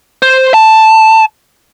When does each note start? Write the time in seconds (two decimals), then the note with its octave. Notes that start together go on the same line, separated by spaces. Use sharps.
0.22 C5
0.54 A5